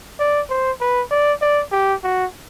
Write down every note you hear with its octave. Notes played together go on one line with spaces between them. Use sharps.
D5
C5
B4
D5
D5
G4
F#4